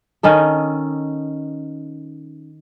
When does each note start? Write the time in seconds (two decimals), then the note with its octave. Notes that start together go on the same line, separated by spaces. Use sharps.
0.23 D#3 C#4 D#4 A4